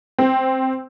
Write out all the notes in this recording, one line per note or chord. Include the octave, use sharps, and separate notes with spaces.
C4